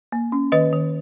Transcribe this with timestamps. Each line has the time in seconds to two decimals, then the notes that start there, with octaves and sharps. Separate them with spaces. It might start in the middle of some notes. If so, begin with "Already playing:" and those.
0.12 A#3
0.32 C#4
0.52 D#3 B4 D#5
0.73 D#3